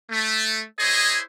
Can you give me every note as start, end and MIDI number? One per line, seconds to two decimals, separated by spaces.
0.11 0.63 57
0.80 1.20 64
0.80 1.20 68
0.80 1.20 72
0.80 1.20 73
0.80 1.20 75